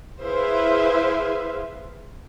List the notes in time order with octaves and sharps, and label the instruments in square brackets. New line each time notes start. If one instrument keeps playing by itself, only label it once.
[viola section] E4 G#4 B4 C5 E5 F5